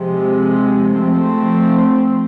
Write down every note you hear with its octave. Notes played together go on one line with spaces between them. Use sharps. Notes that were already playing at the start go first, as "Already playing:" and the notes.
Already playing: C3 F3 G#3
F3 A3 C4